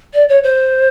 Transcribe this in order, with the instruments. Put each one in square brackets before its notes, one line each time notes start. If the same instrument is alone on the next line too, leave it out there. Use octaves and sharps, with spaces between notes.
[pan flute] D5
C#5
C5